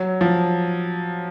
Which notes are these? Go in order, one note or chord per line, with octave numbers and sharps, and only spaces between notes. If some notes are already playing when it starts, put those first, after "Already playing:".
Already playing: F#3
F3